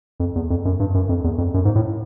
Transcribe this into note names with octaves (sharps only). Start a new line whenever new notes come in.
F2
E2
F2
F#2
G2
F#2
F2
E2
F2
F#2
G#2
A2